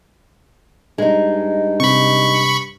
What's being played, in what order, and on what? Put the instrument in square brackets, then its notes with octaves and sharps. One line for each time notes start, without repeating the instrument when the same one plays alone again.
[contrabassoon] G2 [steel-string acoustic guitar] G#3 D#4
[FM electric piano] C3 [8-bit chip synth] B5 C#6